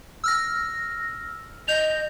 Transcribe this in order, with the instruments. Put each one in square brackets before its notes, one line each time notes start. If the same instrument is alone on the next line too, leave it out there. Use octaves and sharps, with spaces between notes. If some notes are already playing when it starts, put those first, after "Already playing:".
[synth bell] E6 F6 A#6
[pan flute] D#5 [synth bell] G6 F7